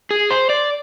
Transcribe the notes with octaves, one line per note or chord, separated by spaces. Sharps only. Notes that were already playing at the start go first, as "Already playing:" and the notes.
G#4
C5
D5